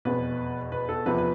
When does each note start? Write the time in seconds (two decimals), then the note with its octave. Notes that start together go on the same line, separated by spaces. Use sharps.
0.05 F1 E2 B2 B4
0.72 B4
0.89 A4
1.06 E2 C3 F3 B4
1.18 B4